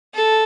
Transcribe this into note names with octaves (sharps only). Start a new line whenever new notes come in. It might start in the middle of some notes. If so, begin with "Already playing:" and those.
A4